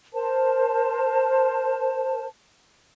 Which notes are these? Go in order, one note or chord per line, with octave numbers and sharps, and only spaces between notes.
A#4 C5 A5